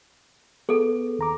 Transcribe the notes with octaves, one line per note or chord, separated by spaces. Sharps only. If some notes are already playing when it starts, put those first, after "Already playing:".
B3 G#4 A4
D#2 A#5 D6